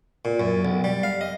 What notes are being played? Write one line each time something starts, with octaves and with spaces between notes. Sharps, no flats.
A#2
F#2
B1
G3
F5
D#5